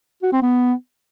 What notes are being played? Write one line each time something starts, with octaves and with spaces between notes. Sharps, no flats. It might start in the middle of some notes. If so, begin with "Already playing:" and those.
F#4
C4
B3